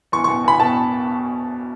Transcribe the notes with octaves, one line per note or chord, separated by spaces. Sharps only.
E2 C#6
B2 C#6
E2 B5
B2 A5